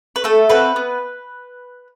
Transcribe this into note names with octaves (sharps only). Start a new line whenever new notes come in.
B4
A3 A4
C4 F#4 A4 B4
B3